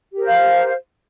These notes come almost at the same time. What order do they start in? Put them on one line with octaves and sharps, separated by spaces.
G4 A#4 C5 F5